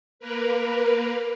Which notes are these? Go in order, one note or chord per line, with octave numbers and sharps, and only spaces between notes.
A#3 A#4 B4